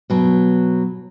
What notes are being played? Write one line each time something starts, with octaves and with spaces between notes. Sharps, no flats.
B2 F#3